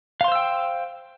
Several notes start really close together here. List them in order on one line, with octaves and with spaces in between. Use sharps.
F5 C6 C5 E6 G5